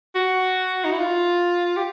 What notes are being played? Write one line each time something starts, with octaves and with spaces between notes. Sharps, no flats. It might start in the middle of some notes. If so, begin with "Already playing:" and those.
F#4
D#4
E4
F4
G4